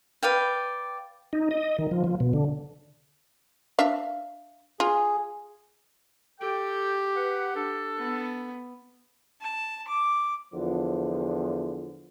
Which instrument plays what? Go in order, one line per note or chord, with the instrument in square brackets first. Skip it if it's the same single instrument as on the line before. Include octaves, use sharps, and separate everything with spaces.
[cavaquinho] B4 D5 F5 G5
[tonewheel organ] D#4
D#5
D#3
F3
F3
B2
D3
[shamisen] D4 E5 F5
[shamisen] F4 [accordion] G#4
[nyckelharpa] G4 [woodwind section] A4 G5
[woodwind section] B4 F#5
D4 A4
[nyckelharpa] B3
[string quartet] A5
D6
[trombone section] E2 D3 F3